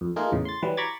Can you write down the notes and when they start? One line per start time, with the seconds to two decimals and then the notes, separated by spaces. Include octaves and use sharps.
0.01 F2
0.16 A3 A#3 D#4 F4 G#4 A#4
0.32 E2 A2 C#3
0.45 C6 A6
0.62 E3 F#3 G3 B4
0.77 A#5 B5 C#6 D6 G#6 A6